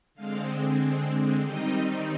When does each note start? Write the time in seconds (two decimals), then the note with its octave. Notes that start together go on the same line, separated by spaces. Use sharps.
0.15 D3 G#3 C4 F5
1.42 D#3 G3 C4 D#4 D#5